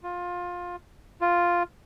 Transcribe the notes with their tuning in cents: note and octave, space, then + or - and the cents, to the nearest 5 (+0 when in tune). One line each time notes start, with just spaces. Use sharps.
F4 +20
F4 +0